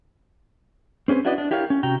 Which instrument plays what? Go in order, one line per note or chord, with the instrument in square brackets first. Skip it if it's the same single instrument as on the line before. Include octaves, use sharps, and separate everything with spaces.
[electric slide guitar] C4 C#4 G#4 B4 C5
D4 E4 F#4 B4 D5 D#5
D4
E4 G4 A#4 C#5 F5
C#4
C3 F#4 G5 A#5